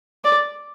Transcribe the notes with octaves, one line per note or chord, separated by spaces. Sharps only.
D5